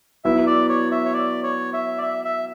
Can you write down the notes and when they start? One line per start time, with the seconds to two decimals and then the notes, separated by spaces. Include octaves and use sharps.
0.25 F#3 B3 E4 B4 E5
0.47 D5
0.69 C#5
0.91 E5
1.05 C#5
1.14 D5
1.44 C#5
1.73 E5
1.98 D5
2.03 E5
2.25 E5